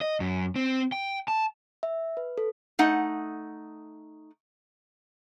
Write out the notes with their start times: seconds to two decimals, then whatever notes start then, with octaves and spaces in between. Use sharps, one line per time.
0.01 D#5
0.20 F#2
0.56 C4
0.92 G5
1.28 A5
1.83 E5
2.17 B4
2.38 A4
2.79 A3 D#4 F#5